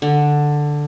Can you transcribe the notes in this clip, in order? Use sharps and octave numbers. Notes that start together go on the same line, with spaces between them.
D3